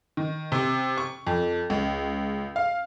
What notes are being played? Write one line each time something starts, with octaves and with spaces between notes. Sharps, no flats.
D#3
C3
C#6
F2
C#2
F5